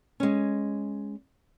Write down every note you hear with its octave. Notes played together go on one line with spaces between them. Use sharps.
G#3 C#4